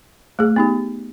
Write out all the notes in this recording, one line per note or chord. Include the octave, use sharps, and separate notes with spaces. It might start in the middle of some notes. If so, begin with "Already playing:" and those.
A3 G#4
B3 D#4 G4